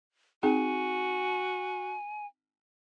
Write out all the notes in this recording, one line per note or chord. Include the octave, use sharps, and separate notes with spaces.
C4 D#4 F#4 G#4 G#5